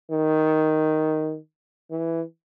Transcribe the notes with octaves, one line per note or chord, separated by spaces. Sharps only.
D#3
E3